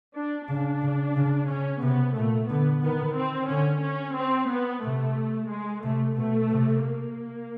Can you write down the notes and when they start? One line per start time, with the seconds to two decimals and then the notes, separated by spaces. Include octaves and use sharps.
0.16 D4
0.49 C#3 D4
0.82 C#3
1.16 C#3
1.49 C#3 C#4
1.82 C3 B3
2.16 A#2 A3
2.49 D3 B3
2.82 D#3 B3
3.16 C4
3.49 D3 C#4
3.83 C#4
4.16 C4
4.49 B3
4.83 C3 A3
5.50 G#3
5.83 C3 A3
6.16 B2 A3
6.50 C3
6.83 A#3